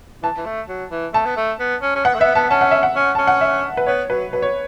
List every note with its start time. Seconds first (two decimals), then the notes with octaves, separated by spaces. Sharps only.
0.23 E3 A5
0.37 E3
0.46 A3
0.69 F#3
0.91 E3
1.14 A3 A5
1.26 B3
1.37 A3
1.60 B3
1.82 C#4
1.96 C#4
2.05 B3 F#5
2.15 A3
2.20 B3 E5
2.35 B3 A5
2.51 C#4 A5
2.61 F#5
2.71 E5
2.83 F#5
2.96 C#4
3.15 C#4 A5
3.27 F#5
3.41 E5
3.77 B4
3.86 B3 C#5
4.10 F#3 B4
4.33 F#3 B4
4.42 C#5